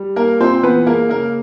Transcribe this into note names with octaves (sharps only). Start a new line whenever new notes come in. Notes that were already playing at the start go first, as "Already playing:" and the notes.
Already playing: G3
A#3 A#4
A#2 C4 C5
E3 B3 B4
G#3 A#3 A#4
C#3 A#3 A#4